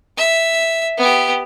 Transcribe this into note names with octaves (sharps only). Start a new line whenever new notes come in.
E5
B3 G4